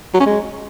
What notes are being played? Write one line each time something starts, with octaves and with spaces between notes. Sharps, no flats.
F#3
C#4
G#3